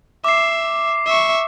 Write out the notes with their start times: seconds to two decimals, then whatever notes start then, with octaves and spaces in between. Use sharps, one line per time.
0.24 E5 D6 C7
1.06 E5 C#6